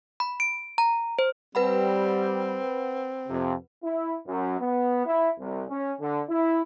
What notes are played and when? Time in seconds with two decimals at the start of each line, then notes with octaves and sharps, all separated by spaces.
0.20 B5
0.40 D7
0.78 A#5
1.19 C5
1.55 G3 C4 B4 F#5 B5
3.28 F2 C3
3.83 E4
4.26 F#2
4.59 B3
5.06 E4
5.39 C2
5.69 C#4
6.00 D3
6.29 E4